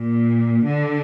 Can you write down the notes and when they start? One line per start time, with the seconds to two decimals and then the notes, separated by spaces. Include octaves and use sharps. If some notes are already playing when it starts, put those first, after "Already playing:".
Already playing: A#2
0.65 D3